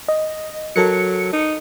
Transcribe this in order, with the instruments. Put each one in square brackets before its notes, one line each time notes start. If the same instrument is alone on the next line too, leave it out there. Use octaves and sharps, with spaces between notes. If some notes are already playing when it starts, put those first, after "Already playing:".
[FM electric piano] D#5
[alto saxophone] F#3 [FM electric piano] A4 A#4 C#7
[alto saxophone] D#4